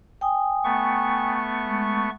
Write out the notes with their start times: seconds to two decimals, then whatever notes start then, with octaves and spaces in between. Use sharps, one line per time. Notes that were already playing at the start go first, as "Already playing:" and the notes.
0.21 G5 G#5 D#6
0.64 A3 B3 C#6
1.66 G#3